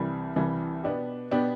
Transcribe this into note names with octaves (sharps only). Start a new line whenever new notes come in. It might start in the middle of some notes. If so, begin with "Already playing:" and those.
Already playing: C2 C3 E3 G3
C2 C3 E3 G3
B2 B3 D4 G4
B2 B3 D4 G4